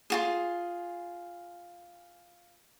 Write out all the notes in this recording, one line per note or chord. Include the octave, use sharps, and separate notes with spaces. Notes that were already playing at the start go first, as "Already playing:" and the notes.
F4 F#4 G#4